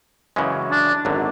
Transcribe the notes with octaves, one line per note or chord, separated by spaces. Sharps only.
F#2 C#3 E3 G#3 C#4
D4
G#1 F#2 D3 F#3